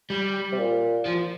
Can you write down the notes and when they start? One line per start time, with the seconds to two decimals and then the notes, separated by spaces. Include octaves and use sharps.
0.10 G3
0.52 C3
0.58 A#2
1.06 F3